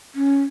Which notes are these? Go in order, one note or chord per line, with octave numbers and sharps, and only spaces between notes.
C#4